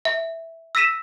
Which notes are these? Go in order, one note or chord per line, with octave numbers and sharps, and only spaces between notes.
E5
E6 A#6 B6 D#7 E7